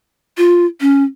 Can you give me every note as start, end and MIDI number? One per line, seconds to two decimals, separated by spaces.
0.37 0.66 65
0.81 1.03 61